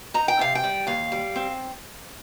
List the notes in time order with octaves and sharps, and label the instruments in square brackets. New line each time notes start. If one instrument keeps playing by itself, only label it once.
[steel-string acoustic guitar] D#4 A#5
G5
C3 F5
G5
G3
D#2 F5
G3
C4